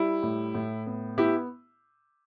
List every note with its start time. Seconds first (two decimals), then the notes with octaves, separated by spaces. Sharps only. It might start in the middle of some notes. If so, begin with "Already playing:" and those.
Already playing: G3 E4
0.23 A2
0.54 A2
0.86 B3
1.18 B3 E4 G4